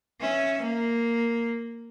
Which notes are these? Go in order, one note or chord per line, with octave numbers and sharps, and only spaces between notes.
C#4 E5
A#3